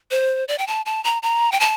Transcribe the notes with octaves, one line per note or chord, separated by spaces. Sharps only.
C5
D5
G5
A5
A5
A#5
A#5
G5
A5